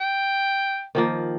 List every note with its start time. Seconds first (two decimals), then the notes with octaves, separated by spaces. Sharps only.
0.01 G5
0.95 D#3 F3 A#3